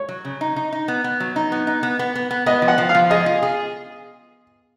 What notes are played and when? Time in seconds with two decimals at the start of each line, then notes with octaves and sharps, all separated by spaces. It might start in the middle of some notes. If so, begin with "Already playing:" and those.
Already playing: C#5
0.09 F#3
0.25 C#3
0.41 D#4
0.56 D#4
0.73 D#4
0.88 B3
1.04 B3
1.20 F#3
1.36 D#4
1.52 B3
1.67 D#4
1.83 B3
1.99 B3
2.15 B3
2.31 B3
2.46 B3 D#5
2.62 F3
2.68 F#5
2.78 F3
2.89 F5
2.95 F3
3.10 G#4 D#5
3.26 F4
3.43 G#4